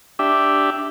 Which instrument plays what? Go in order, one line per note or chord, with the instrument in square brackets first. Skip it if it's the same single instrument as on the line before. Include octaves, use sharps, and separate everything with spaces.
[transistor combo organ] D4 G4 E5